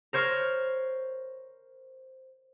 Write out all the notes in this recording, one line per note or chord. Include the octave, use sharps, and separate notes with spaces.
A#4 C5 C#5 F6